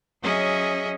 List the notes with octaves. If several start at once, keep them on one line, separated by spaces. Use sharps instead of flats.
F#3 C#4 G#4 D#5 E5